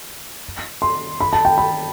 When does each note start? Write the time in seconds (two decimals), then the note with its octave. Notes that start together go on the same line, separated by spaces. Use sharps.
0.82 C6
1.21 B5
1.33 A5
1.45 G5
1.58 B5